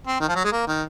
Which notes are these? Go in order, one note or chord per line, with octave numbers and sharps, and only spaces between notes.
C4
D#3
F3
F#3
G#3
A#3
D#3